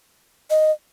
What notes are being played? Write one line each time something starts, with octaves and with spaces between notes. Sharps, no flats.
D#5